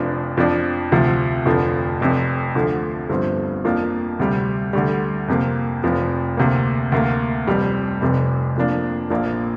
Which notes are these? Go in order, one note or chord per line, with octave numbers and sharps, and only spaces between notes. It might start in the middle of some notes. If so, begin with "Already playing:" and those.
Already playing: F1 F2 F3 D4
F2 F3 D4
D2 C3 F3
F1 F2 D3 F3
F1 F2 C3
D2 D3 F3
G1 G2 F3 C4
F2 F3 A#3 D4
D2 C3 G3
D2 D3 G3
F2 C3 A#3
F1 F2 F3
D2 C3 A#3
D2 C3 A#3
F1 F2 C3 G3
F1 F2 C3
F2 F3 A#3 D4
A#1 A#2 F3 A#3 D4